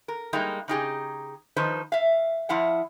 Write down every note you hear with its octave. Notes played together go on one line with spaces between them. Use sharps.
A#4
G3 G#3 A#3 D#4
C#3 D#4 G4 G#4
D#3 F3 D#4 B4 C5
E5 F5
F3 E4 F5 F#5